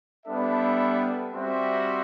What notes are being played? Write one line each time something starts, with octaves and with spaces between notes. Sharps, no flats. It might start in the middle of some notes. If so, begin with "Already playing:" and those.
G3 B3 D4 A4 E5
G3 C4 F#4 C5 E5